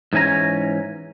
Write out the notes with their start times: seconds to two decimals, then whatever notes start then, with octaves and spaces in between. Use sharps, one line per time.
0.13 G#2 E3 C#4 G#5 A#5